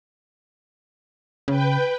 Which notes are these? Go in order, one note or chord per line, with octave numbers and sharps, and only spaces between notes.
C#3 B4 G5